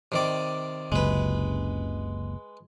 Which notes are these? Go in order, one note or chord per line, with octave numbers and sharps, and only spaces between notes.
C3 D#3 D5
F#1 C#2 C3 G#3 B4